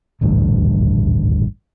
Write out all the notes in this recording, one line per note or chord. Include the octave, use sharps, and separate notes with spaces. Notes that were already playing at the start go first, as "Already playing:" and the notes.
D#1 A1 D2 G2